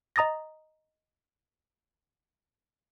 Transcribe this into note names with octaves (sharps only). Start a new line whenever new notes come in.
D#5 A#5 D#6 A6 A#6